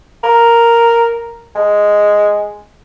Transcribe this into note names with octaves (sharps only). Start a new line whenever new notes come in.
A#4
G#3